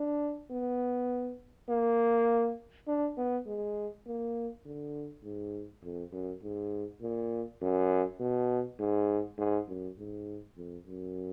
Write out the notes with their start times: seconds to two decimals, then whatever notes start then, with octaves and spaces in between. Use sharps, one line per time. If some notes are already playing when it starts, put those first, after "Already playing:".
Already playing: D4
0.51 B3
1.69 A#3
2.87 D4
3.17 B3
3.46 G#3
4.07 A#3
4.66 D3
5.24 G#2
5.83 F2
6.13 F#2
6.43 G#2
7.02 A#2
7.61 F#2
8.20 B2
8.79 G#2
9.38 G#2
9.68 F#2
9.98 G#2
10.57 F2
10.87 F#2